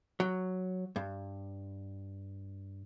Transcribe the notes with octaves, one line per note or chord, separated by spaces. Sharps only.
F#3
G2